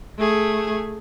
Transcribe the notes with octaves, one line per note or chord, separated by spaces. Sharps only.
A3 G#4